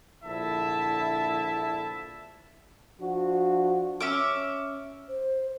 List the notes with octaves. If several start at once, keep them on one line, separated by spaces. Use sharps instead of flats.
A#1 D3 E4 E5 A5
F3 D4 F#4
C#4 E5 D6
C5